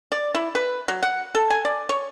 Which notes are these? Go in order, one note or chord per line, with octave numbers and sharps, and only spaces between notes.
D5
E4
B4
F#3
F#5
A4
G#5
D5
C#5